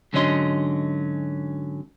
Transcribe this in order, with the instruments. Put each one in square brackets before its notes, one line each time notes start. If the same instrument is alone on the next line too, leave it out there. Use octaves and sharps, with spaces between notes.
[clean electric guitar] G#2 D3 F#3 C#4 D#5 C6